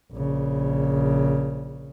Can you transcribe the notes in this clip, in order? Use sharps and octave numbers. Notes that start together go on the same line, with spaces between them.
A#1 C#3